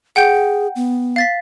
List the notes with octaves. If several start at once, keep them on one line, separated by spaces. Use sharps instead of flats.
G#4 F#5 G5 G6
B3
F5 A6 B6